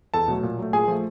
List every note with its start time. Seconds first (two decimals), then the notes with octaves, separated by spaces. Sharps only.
0.14 E2 A4 A5
0.28 B2 F#3 A3
0.43 A#2
0.58 F#3 A3
0.73 A#2 G#4 G#5
0.88 F3 A3